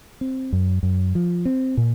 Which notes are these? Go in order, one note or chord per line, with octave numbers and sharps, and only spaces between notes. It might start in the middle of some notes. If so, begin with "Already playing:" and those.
C4
F#2
F#2
F3
C4
A#2